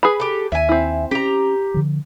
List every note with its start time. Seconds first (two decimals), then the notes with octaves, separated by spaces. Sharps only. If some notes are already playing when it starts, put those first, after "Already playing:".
0.03 G#4 B4 B5
0.20 G4 A4
0.52 D#2 E5 G#5
0.69 C4 E4
1.11 C#4 G4 A#5
1.74 D3 F3